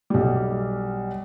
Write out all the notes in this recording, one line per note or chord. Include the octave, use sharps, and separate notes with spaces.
B1 G3